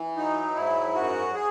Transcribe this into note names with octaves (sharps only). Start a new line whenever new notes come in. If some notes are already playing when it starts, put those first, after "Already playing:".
Already playing: E3
F#3 D#4
G#2 E4
F#2 F#4
G#4